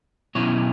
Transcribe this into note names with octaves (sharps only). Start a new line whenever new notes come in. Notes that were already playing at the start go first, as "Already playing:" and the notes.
B2 F#3 C#4 E4 C#5